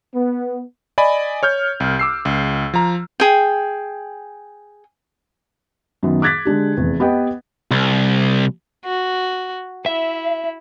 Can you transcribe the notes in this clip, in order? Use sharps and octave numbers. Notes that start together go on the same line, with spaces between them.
B3
D5 D#5 G#5 B5
C#5 F6 G6
C2
D6 E6 C7
C#2
F3 A#5
G#4 G5
F#2 D#3 B3
D6 F#6 G#6 A6 B6
D3 G#3 D4 G4
F1 E2
B3 G4 B4 D#5 F#5 G5
C2
F#4
E4 E5